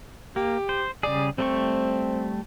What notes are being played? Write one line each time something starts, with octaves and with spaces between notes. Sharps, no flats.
A#3 G4
C5
C#3 G3 G#4 D5
G3 A3 C4 C#6